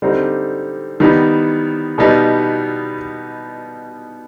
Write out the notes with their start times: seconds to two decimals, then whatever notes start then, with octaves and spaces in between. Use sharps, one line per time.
0.02 D3 G3 C4 D#4
1.00 D#3 G3 B3 D#4
1.98 B2 G3 B3 D#4